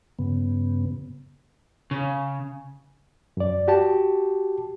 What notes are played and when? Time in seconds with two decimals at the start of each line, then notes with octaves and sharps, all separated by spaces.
0.19 G2 C#3 B3
1.91 C#3
3.37 F#2 D5
3.68 F#4 G4 A5